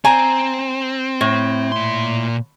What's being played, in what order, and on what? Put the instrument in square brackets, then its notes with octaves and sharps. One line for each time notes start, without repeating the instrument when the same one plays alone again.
[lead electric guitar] C4 [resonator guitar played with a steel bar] G#5 A#5
[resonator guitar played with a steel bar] A2
[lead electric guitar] A#2 C6